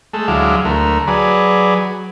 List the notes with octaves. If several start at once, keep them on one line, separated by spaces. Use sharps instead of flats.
G#3 A3 A4
D2 F#3 G#3 E4 F5 D6
D2 A3 A#4
F#3 G#4 B4 D5